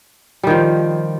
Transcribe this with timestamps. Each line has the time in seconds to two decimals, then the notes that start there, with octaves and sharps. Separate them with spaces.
0.43 G3
0.47 D#3
0.50 F3